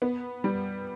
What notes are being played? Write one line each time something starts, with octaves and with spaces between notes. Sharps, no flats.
B3
G3